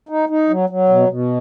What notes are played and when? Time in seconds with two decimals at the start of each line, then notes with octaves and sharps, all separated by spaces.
0.09 D#4
0.29 D#4
0.49 F#3
0.69 F#3
0.89 B2
1.09 B2